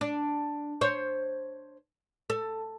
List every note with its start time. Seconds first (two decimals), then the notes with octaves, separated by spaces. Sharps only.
0.01 D4
0.81 C5 C#5
2.30 A4